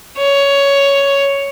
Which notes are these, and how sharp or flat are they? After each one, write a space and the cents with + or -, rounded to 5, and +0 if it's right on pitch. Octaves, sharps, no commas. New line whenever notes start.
C#5 +10